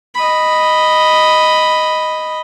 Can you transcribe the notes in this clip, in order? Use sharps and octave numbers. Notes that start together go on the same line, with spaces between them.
D#5 B5